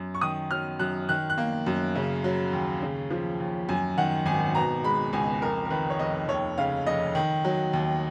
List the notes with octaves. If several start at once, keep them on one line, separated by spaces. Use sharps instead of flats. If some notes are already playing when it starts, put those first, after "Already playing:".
Already playing: F#2
C#6
D#3 D#6
F#3 F6
F#2 F#6
D#3 F#6
F#6
A#3
F#2
C#3
F#3
D#2
C#3
F3
D#2
F#2 G#5
D#3 F#5
G#1 G#5
B2 A#5
G#3 B5
C#2 G#5
F2 A#4
A#4
D#3 B4
C#5
F1 D#5
D#2 C#5
C#3 F5
F1 D#5
D#3
F#3
D#2